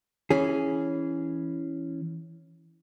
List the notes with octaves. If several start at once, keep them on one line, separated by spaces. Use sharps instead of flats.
E3 C#4 G#4